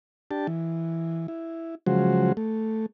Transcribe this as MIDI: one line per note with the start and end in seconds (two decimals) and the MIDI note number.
0.31 0.47 62
0.31 0.47 67
0.31 0.47 81
0.47 1.27 52
1.28 1.75 64
1.86 2.32 49
1.86 2.32 53
1.86 2.32 54
1.86 2.32 56
1.86 2.32 66
1.86 2.32 72
2.37 2.86 57